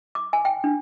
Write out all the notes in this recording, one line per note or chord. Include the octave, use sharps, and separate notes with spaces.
D6
G#5
G5
D4